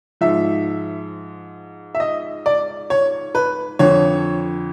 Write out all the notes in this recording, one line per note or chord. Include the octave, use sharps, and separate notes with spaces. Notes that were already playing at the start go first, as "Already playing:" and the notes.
G#2 F3 E5
E5
D#5
D5
C#5
B4
F2 D3 F3 C#5